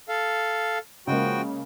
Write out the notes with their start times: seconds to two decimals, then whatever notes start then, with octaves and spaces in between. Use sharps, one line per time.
0.09 A4 F5
1.07 C#3 F3 G#3 A#3 F#4 G5